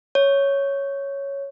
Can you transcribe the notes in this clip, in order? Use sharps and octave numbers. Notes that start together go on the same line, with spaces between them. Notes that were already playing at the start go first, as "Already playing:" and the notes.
C#5